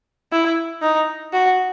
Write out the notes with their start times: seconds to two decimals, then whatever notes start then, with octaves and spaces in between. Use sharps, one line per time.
0.32 E4
0.82 D#4
1.33 F#4